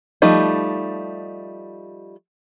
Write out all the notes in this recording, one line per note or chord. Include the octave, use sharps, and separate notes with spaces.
F3 G3 A3 D#4